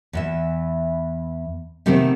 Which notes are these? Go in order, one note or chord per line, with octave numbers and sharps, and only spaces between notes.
E2 E3 E5
C3 D#3 A3 B3 C4